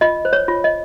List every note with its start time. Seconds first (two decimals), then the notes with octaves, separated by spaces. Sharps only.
0.01 F4 D#5
0.25 C5
0.33 C#5
0.48 F4
0.64 D#5